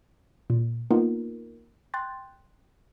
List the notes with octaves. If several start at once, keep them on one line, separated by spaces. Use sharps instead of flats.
A#2
A#3 B3 D#4 F4 A#4
G5 C6 F#6 G6 A6